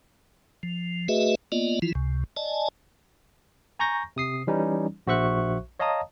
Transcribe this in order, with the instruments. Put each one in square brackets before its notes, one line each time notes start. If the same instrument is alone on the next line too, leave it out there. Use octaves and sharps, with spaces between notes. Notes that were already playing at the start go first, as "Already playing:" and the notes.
[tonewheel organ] F3
A3 F#4 G#4 B4 D#5 E5
A#3 B3 F4 D5 D#5
E3 F3 E4 F4
C#2 C3
D5 D#5 G#5 A5
[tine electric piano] G#5 A#5 C#6 G6 A#6
C3 D#6 C7
E3 G3 C#4 D#4
A#1 F#4 C5 E5 C#6 F#6
C#5 D#5 F5 A5 A#5 D#6